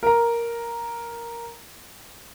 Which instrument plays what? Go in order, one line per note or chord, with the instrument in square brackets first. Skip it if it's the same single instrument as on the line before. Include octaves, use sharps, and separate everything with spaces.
[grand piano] A#4 A#5